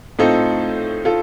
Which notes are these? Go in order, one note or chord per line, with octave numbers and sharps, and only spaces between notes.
A2 A3 C4 D#4 F4 A4
F4 A4